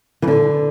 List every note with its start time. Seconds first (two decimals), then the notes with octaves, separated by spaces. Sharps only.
0.22 E3
0.28 D3